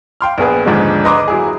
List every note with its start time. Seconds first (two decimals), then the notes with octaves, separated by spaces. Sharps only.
0.21 F5 G5 C6 F6
0.38 A#1 B3 G#4 B4
0.66 D#2 G#2 D3 F3 G#3 D4
1.05 B4 D#5 A#5 C6 D6
1.28 F#3 E4 G#4